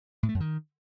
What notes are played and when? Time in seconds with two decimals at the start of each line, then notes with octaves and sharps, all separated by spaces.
0.23 A2
0.29 A3
0.35 F#2
0.40 D#3